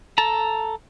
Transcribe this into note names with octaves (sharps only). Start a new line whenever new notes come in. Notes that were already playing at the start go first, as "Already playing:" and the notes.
A4 A5 A#5